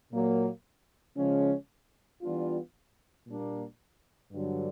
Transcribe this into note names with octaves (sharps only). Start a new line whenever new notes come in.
A#2 F#3 A#3
C#3 F3 G#3 C#4
E3 G3 B3 D4 F4
A#2 G3 A#3 D4
G2 D3 F#3